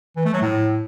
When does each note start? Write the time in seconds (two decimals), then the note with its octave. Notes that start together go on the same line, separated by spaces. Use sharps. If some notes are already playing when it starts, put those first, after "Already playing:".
0.16 E3
0.25 A3
0.33 F#3
0.42 A2